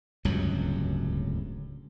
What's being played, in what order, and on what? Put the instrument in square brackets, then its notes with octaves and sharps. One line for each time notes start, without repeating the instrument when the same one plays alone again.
[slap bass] D1 C#2 G2 F#3